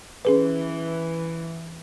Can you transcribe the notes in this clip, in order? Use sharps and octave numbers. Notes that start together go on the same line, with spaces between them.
E3 C#4 G#4 B4